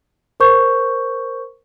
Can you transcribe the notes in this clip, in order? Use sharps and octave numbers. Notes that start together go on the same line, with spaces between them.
A#4 C5 C#6 G6